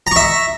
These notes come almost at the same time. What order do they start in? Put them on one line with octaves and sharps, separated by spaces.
A#5 C#6 E5